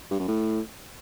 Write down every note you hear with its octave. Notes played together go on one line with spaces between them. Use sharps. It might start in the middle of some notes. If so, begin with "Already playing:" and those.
G2
F#2
A2